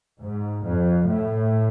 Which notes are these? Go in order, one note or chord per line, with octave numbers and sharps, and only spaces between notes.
G#2
F2
A2